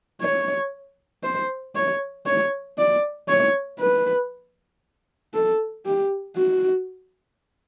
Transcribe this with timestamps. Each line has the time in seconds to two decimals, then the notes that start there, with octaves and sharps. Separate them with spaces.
0.21 C#5
1.23 C5
1.75 C#5
2.26 C#5
2.78 D5
3.28 C#5
3.80 B4
5.33 A4
5.85 G4
6.37 F#4